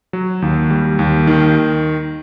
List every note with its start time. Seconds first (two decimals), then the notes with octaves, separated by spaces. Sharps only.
0.13 F#3
0.42 D#2
0.70 G3
0.99 D#2
1.27 D#3